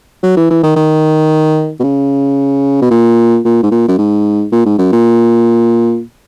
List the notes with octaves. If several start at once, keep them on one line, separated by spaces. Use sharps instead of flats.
F#3
E3
E3
D#3
D#3
B2
C#3
B2
A#2
A#2
G#2
A#2
F#2
G#2
A#2
G#2
F#2
A#2